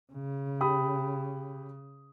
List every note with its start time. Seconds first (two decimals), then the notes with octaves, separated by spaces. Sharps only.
0.13 C#3
0.61 G4 B5 D#6